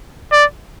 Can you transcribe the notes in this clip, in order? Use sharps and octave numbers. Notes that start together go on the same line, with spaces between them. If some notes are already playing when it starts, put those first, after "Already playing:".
D5